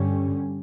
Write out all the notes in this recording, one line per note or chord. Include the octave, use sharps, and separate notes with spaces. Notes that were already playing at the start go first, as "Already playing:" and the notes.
Already playing: G2 D3 G3 C#4